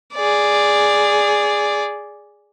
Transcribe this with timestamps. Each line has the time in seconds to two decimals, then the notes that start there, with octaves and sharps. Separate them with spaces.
0.15 G#4 D5